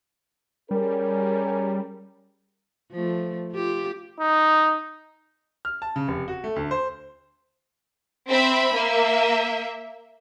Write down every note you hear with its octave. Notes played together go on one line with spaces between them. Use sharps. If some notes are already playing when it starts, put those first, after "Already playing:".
G3 C#4 G#4 A#4
F3 A3
F4 G4
D#4
F6
A5
C#3
F1
F#4
A3
D2
C5
C4 E5 B5
A#3 E5